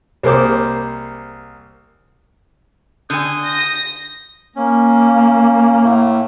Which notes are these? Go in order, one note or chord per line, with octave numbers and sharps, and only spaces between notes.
C2 A#3 G#4 C5 D6
D3 G#5 D#6 G6
A#6
A#3 C#4
A2 A3